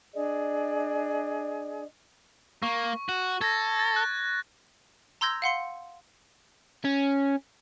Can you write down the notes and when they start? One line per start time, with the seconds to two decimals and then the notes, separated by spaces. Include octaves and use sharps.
0.14 D4 G#4 D5 D#5
2.63 A#3 C#6
3.09 F#4
3.41 A4 G#6 A#6
3.79 A6
3.96 F#6
5.21 A#5 C6 E6 G6 G#6 A#6
5.42 F5 F#5 C6 C#7
6.85 C#4